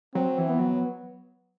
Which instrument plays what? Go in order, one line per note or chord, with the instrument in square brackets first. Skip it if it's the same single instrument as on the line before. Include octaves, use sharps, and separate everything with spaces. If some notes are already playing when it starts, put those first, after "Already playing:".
[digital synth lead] F#3 [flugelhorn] C4
[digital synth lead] E3
[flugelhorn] B3
[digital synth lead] F#3